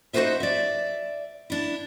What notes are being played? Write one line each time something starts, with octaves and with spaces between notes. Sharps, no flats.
D#4 F#4 G#4 B4 C5 E5
D5 E5
D4 E4